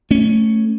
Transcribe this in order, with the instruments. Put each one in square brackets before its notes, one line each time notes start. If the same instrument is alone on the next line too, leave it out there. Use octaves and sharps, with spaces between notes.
[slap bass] A3 C#4